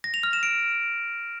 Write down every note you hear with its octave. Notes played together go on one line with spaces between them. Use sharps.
A#6
F7
F6
E7
D7